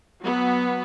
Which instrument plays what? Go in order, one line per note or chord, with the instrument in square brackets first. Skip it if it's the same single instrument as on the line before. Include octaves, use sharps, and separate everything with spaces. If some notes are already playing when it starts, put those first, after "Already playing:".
[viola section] F#3 B3